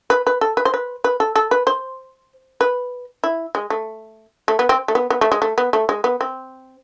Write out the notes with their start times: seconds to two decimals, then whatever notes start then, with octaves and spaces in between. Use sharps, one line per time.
0.10 B4
0.27 B4
0.41 A4
0.57 B4
0.65 C5
0.74 B4
1.04 B4
1.20 A4
1.36 A4
1.51 B4
1.67 C5
2.61 B4
3.24 E4
3.55 G#3
3.70 A3
4.48 A3
4.59 B3
4.69 C4
4.88 A3
4.95 B3
5.10 B3
5.21 A3
5.32 G#3
5.42 A3
5.58 B3
5.73 A3
5.89 G#3
6.04 B3
6.21 C4